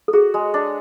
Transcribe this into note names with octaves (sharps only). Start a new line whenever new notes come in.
A4
F#4 G#4
G#3
D4